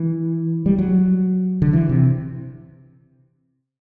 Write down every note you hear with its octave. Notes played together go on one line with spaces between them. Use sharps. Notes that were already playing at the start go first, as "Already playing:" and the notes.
Already playing: E3
G3
F#3
D3
E3
C3